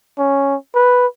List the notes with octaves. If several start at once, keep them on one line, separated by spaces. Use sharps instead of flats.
C#4
B4